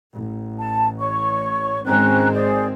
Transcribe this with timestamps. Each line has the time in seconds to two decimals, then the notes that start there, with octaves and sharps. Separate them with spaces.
0.14 A1
0.59 A5
0.99 C#5 C#6
1.85 G#1 G#3 C4 C#4 A#5 F#6
2.33 G#4 C5 D5